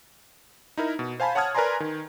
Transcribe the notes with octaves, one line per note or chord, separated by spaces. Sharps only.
D#4 E4 A#4
B2
C5 F5 G#5 A5 B5
C#5 F#5 A5 D#6 F6 G#6
A#4 B4 D5 G#5 A#5 C6
D#3